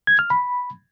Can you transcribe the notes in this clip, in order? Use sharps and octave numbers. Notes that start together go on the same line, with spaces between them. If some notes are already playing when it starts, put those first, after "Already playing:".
G#6
F6
B5